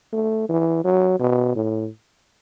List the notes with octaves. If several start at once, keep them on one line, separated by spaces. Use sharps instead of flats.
A3
E3
F#3
B2
A2